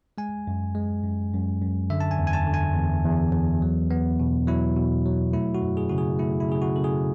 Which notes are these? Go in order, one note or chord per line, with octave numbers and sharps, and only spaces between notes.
G#3 G#5
F#2
G#3
F#2
F#2
F#2
D3 E5
A5
G#5
E2
G#5
A5
D3
G#5
E2
E2
E2
F#3
B3
B2
F#3 E4
B2
F#3
A3 E4
F#4
F#2
G#4
C#3 F#4
G#4
A3 E4
E4
C#3 G#4
F#4
C#3 A4
G#4